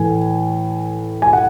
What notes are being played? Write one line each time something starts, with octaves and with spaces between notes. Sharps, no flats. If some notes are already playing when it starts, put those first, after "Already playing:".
Already playing: A2 E3 A3 G#5
G#5
F#5